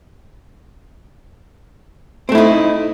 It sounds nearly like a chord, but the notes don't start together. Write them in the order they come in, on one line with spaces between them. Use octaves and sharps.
C4 A3 E4 D#4